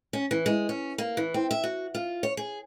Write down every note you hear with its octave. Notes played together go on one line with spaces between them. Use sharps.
C#4
E3
G#3
C#4
A#3
E3
C4
E5
F#4
F4
C#5
G#4